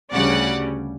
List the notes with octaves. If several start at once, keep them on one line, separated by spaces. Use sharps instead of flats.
D2 C#3 G3 C#4 D5 F#5